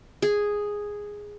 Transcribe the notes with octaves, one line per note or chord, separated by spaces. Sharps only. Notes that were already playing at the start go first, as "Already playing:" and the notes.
G#4